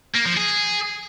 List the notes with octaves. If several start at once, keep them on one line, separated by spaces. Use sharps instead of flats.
A#3
F3
G#4